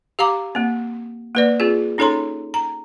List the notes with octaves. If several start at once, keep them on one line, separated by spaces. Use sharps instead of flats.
G4 F5 A#5 D6
A#3 C4
A#3 B4 D5
C4 F4 G#4
C#4 D#4 A4 C#5 A#5 C6
A#5